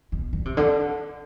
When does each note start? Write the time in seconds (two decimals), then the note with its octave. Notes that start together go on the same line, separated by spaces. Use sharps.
0.12 B2
0.33 D3
0.45 C3
0.57 D3